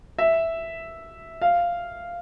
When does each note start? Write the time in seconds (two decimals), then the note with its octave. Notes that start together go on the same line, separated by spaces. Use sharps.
0.19 E5
1.42 F5